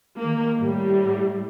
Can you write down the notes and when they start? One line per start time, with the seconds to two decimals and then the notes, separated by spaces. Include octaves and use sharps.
0.19 D#3 A#3
0.58 A2 G3